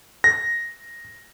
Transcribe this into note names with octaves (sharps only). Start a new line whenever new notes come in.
A#6